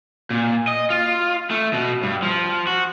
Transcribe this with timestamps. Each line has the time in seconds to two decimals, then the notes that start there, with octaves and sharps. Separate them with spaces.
0.30 A#2
0.68 D#5
0.90 F4
1.50 A3
1.73 B2
2.03 G2
2.23 F3
2.67 F#4